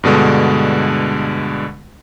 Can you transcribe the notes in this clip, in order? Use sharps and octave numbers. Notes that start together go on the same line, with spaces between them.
G2 B2 D3 G#3